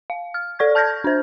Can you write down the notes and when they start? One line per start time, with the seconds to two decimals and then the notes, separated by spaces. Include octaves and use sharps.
0.10 F5
0.34 F6
0.59 A4 D5 C#6 G#6
0.75 A5 F6 G6 G#6 A#6
1.04 D4 C5